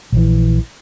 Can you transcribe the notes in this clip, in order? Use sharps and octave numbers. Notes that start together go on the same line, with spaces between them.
A#1 E3